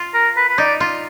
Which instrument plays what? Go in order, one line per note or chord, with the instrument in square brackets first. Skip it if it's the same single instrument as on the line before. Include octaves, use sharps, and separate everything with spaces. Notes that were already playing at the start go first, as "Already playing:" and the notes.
Already playing: [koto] F4
[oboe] A#4
B4
B4
[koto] D#4 [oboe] D5
[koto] F4